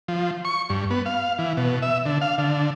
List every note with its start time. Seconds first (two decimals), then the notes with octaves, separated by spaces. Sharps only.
0.08 F3
0.45 C#6
0.70 G2
0.91 B3
1.06 F5
1.39 E3
1.57 B2
1.82 E5
2.06 D3
2.22 F5
2.38 D3